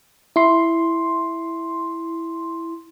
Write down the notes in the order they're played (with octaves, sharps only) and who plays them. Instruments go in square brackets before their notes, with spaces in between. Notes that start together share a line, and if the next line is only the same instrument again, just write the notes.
[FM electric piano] E4 C6